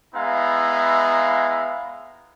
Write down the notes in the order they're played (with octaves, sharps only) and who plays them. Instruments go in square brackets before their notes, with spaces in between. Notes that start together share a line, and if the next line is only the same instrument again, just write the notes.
[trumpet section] G#3 B3 E4 E5 F5 A#5